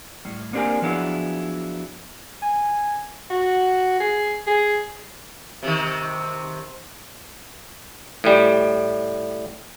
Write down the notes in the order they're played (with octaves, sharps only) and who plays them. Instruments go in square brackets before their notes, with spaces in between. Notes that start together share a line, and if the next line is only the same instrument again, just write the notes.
[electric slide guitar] A2 G3
A#3 C4 D4 G4 A#4 G#5
F3 F#3 B3 D4 E4 G#4
[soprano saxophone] G#5
F#4
G#4
G#4
[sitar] C3 D#3
[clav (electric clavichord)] A2 G3